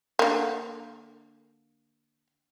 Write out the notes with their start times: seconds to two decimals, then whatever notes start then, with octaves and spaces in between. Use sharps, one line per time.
0.19 D3 A#3